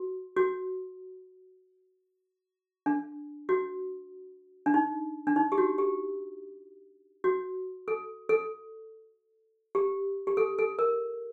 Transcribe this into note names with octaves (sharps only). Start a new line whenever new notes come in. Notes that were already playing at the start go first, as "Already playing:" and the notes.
Already playing: F#4
F#4
D4
F#4
D4
D#4
D4
D#4
G4
F#4
G4
F#4
A4
A4
G4
G4
A4
A4
A#4